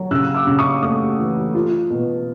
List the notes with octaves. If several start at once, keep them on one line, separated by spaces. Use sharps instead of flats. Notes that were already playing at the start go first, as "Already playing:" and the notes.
Already playing: F#3
C#3 E6 F#6
D6 E6
C#3
C#6 D#6
A3 C#6 D#6
E3
F4
B2